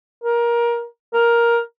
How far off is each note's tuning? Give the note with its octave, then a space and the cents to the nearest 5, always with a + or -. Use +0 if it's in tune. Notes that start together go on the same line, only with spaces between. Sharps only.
A#4 +20
A#4 +10